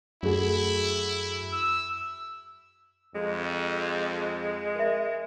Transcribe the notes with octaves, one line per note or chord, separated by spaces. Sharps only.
F#2 A3 E4 F#4 G#4
E6
F2 G#3
A#4 E5